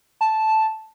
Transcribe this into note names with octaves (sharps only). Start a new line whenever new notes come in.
A5